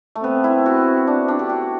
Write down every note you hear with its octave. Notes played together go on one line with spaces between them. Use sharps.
A3
B3 C4
E4
F#4
D4
D4
G4
F#4